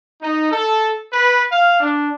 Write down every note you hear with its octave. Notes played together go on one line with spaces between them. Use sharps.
D#4
A4
B4
F5
D4